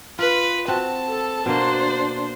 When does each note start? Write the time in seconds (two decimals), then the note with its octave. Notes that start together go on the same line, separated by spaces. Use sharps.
0.19 F4 B4
0.68 C4 F#4 A5
1.09 A4
1.46 B2 A#3 D4 C5